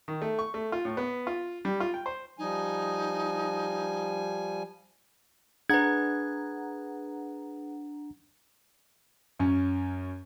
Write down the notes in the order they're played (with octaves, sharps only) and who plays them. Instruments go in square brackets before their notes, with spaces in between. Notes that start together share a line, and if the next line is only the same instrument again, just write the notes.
[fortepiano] D#3
A3
C#6
A3
F4
A2
B3
F4
G3
F4
G5
C5
[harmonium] F3 G3 G#5 [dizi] D#4
[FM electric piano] D4 F#5 A#5 [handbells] G#4 B4 [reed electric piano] G#6
[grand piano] F#2 C#4